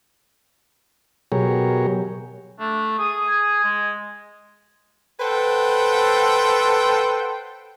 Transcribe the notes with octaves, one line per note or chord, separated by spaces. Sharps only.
B2 F#3 G4 G#4 A#4 C#5
A3 D4
G#4 D#6
G#5
G#3
A4 B4 C5 F#5 G5